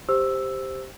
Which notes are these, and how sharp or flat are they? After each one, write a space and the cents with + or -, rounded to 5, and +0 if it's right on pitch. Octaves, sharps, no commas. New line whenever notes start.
G4 +0 C5 +0 E6 +0